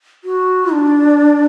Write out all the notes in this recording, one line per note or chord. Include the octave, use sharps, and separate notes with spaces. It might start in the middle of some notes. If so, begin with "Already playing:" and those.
F#4
D4